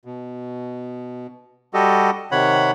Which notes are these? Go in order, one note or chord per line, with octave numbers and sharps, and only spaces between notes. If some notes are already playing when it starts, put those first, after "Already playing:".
B2
G3 F#4 G4 A4 D#5
C3 D#3 C#5 F#5 B5